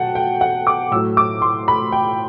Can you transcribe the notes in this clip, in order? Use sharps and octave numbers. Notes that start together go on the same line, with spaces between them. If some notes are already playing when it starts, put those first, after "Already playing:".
Already playing: B2 F#3 F#5 G5 A5
G5
F#5
D6
A2 F#3 E6
D6
C6
B5
G5